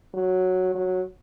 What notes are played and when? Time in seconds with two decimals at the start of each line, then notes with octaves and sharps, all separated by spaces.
0.14 F#3
0.75 F#3